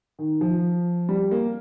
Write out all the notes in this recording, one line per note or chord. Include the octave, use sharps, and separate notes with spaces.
D#3
F3
G3
A#3